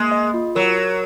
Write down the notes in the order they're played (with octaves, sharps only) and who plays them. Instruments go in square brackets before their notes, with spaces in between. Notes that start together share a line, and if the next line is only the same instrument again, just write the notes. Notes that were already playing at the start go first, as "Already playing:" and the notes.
Already playing: [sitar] G#3 [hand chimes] A#3
[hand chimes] D#5
F4
[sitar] F#3 [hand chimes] A#4
[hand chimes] A#4